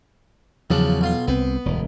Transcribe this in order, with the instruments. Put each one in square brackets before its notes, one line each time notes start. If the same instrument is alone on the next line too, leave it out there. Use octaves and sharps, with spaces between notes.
[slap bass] E2 F#3 [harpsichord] C#3 F3 D4
[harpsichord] B1 F4 C6
[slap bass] C2 C4 [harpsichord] B3
[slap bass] E1 D2 G2